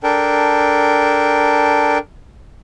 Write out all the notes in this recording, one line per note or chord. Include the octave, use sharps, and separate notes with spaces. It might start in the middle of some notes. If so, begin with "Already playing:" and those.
D4 A4 A#4 G5